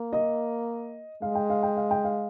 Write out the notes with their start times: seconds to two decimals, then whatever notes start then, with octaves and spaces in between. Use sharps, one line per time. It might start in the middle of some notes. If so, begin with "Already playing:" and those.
Already playing: A#3
0.13 D#5
1.22 G#3 F5
1.35 G5
1.50 F5
1.63 G5
1.77 F5
1.91 G5
2.04 F5